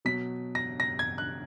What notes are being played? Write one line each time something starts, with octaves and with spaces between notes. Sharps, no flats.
B2 F#3 B6
A#6
A#6
G#6
F#6